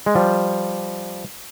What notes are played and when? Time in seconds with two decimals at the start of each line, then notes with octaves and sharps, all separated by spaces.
0.06 G#3
0.15 F3 G3